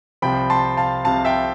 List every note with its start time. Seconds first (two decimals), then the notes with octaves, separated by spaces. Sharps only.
0.22 C2 C3 F3 G5 B5
0.50 A5 C6
0.77 F5 A5
1.04 C2 C3 F3 F5 A5
1.25 E5 G5